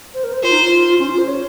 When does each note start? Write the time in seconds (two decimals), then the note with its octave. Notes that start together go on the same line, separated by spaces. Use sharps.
0.14 C5
0.24 A#4
0.33 C5
0.43 F4 C5
0.52 D#4
0.62 F4
1.00 C#4
1.10 F4
1.18 C5
1.27 C#5